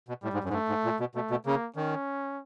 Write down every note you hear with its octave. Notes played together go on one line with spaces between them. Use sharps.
B2
A2 G3
G#2
F#2
G#2
G2 A3
G#2
A#2
B2
B2 A3
B2
C#3 A#3
D#3 C#4